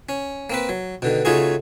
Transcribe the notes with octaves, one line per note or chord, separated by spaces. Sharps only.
C#4
A#3 C4 B4
F#3
B2 D3 D#3
C#3 A3 D#4 F4 F#4 G#4